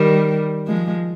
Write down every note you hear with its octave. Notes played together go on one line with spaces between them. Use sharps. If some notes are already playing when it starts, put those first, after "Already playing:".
Already playing: D#3 G3
F3 G#3